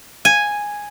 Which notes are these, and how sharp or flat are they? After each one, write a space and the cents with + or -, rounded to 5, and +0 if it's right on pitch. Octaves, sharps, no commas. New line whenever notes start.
G#5 -5